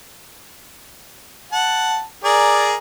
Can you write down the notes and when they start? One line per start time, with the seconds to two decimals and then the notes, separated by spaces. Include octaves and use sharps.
1.52 F#5 A5
2.24 G#4 A#4 D5